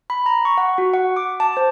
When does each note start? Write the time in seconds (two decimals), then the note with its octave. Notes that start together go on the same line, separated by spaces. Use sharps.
0.10 B5
0.26 A#5
0.45 C#6
0.58 F#5
0.78 F#4
0.94 F#5
1.16 D6
1.40 A5
1.57 C5